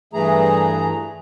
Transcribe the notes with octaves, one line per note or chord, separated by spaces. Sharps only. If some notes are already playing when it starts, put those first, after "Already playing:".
G2 E3 A3 G#4 A#5